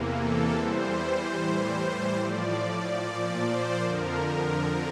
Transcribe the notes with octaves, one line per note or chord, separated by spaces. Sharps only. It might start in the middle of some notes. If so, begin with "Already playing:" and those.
Already playing: E2 C3 E3 A#3
A4
E2 E3 G3 C5
C5
A2 E3 G3
A2 F3 D5
D5
A#2 F3 D5
C5
F2 D3 F3 A#4
A#4